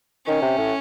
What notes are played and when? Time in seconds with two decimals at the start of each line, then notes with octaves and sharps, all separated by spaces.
0.26 D#3 C#4
0.42 C3
0.58 A2